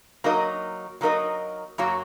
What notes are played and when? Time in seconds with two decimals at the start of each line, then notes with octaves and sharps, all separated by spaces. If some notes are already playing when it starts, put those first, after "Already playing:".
0.24 F#3 A#3 D#4 A#4 D#5
1.01 F#3 A#3 D#4 A#4 D#5
1.78 F#2 F#3 A#3 F#4 C#5